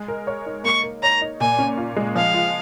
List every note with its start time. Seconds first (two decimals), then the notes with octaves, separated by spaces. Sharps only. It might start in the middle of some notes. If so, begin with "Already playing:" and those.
Already playing: G#3
0.08 A#4
0.27 C#5
0.46 D#4
0.64 A#3 C#6
0.83 A#4
1.03 C#5 A#5
1.22 D#4
1.40 A#2 G#5
1.59 C#4
1.78 F4
1.96 G#3
2.15 F3 F5
2.34 F4